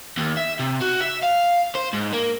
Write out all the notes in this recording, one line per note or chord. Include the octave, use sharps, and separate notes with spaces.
D#2
E5
C3
F#4
E5
F5
C5
G#2
A#3